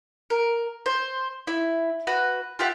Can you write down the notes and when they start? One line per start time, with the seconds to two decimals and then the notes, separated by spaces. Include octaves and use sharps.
0.30 A#4
0.86 C5
1.47 E4
2.07 F#4 B4
2.59 F4 G4 E5 F#5